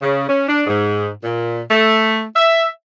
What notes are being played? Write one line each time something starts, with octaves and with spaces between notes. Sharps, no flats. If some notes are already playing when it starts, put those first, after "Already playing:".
C#3
C#4
D4
G#2
A#2
A3
E5